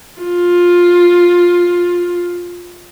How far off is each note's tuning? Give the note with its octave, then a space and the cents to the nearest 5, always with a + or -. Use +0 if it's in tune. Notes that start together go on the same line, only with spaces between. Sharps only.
F4 +10